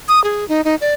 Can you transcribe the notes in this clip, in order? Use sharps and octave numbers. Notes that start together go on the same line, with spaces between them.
D#6
G#4
D#4
D#4
D5